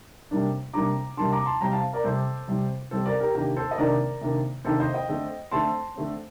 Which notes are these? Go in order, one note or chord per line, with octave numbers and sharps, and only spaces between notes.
C3 G3 A#3 D4
C3 G3 A#3 D4 A#5 D6
C3 G3 A#3 D4 A5 C6
A#5 D6
A5 C6
C3 G3 C4 G5 A#5
F5 A5
A#4 D5
C3 G3 C4 A4 C5
C3 G3 C4
C3 G3 C4 A4 C5
A#4 D5
G4 A#4
C3 D#3 A#3 D4 G4 A#4
A4 C5
D#5
C3 D#3 A#3 D4 A#4 D5
C3 D#3 A#3 D4
C3 D#3 A#3 D4 A4 C5
C5 D#5
D#5 G5
D3 A3 C4
D3 A3 C4 A5 C6
D3 A3 C4